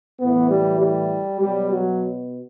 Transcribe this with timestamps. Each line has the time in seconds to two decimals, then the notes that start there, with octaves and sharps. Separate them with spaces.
0.20 A2 E3 B3
0.49 G3
0.80 G3
1.40 B2 F#3 G3
1.70 F#3